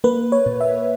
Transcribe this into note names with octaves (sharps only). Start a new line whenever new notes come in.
A#3 B4
C#5
A#2
E5